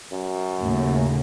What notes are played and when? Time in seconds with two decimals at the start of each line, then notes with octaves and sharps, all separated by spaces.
0.12 F#2
0.60 D#2 A2 C#3